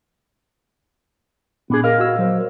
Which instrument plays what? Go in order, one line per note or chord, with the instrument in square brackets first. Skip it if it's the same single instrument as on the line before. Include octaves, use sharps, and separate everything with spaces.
[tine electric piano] A#2 [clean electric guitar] B3 D4 G#4
[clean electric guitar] A#4 D#5 F5
[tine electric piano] F#4 E6
F#3 C5